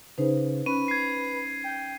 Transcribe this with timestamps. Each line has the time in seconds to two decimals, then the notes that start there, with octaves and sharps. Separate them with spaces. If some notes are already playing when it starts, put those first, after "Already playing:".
0.18 C#3 D#4 B4 C5
0.66 C#4 B4 D#7
0.88 G#6 C7
1.64 G5